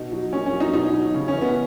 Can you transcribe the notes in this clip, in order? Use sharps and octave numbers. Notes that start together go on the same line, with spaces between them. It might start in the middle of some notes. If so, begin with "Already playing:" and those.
Already playing: B2 D#4
F#3
A#2 C#4
C#4
F#3
D#4
B2 D#4
F#3
C#3
C#4
E3
B3